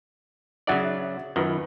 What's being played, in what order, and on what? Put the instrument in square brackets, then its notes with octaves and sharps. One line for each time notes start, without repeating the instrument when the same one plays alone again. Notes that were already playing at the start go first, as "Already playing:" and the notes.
[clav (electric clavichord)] C#3 F#3 D5 [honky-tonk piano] E5 F#5 A6
[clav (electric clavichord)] F#2 D#3 [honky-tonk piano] F4 B4